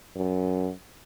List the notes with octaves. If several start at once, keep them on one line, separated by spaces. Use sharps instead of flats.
F#2